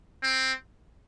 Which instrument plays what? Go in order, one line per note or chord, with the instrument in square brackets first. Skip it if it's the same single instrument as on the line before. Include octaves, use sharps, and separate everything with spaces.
[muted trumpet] C4